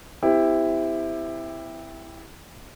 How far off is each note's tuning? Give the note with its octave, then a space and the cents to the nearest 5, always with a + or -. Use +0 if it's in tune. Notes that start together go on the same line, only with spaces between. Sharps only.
C4 -35 E4 +0 G4 +20